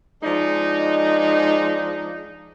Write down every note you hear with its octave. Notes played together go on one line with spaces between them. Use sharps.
F3 G#3 D4 D#4